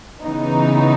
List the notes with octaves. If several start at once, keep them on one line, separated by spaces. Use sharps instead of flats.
C#3 E3 B3 D#4